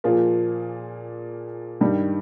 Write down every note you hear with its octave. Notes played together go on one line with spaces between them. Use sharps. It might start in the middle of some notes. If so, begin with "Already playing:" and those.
A#2 F3 A#3 G#4
G2 D#3 G3